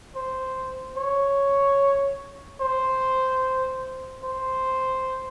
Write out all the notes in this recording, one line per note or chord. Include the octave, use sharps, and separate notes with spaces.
C5
C#5
C5
C5